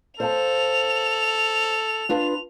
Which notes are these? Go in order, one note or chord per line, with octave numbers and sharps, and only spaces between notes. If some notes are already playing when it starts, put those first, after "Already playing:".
A4 C5 F5 A5 F7
D4 F4 B4